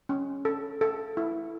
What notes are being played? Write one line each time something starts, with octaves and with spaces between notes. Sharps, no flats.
C#4
A4
A4
E4